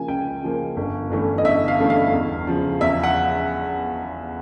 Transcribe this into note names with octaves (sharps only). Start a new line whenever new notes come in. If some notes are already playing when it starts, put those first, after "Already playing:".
Already playing: C#3 F3 A#3 G#5
C#2 G5
C#3 F3 A#3
G1
G2 E3 A3 C#4
D#5
G1 E5
F5
G2 E3 A3 C#4
F5
E2
C#3 F3
E2 E5
F#5